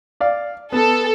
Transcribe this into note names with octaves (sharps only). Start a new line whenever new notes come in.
D5 F5
B3 A4